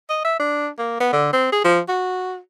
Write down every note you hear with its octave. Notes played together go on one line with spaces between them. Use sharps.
D#5
E5
D4
A#3
B3
D3
C4
G#4
F3
F#4